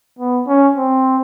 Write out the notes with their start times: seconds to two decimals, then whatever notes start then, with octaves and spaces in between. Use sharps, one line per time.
0.19 B3
0.47 C#4
0.76 C4